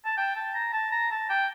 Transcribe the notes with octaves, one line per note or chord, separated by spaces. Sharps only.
A5
G5
A5
A#5
A5
A#5
A5
G5